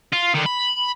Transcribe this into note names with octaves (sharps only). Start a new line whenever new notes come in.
F4
D3 D#3
B5